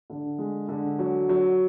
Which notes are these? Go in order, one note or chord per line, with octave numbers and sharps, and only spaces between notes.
D3
G#3
D3
F#3
F#3